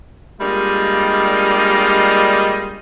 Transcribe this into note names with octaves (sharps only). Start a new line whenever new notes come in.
G3 G#3 A#3 D4 F4 D#5